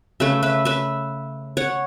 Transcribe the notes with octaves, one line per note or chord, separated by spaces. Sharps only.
C#3 A3 B4 E5
B4 E5
B4 E5
C#5 F#5